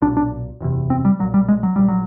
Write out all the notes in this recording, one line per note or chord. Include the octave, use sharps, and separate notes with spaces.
B1 A#2 D4
D4
F#1 E2 C3
C4
G3
B1 A#2 F#3
G3
G#3
F#3
A#1 A#2 G3
F#3